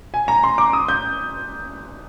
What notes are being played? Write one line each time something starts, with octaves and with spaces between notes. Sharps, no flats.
G#5
A#5
C6
D6
D#6
G6